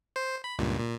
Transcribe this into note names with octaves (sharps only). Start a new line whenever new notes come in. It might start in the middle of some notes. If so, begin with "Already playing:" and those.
C5
B5
C#2 G2 A#2
A#2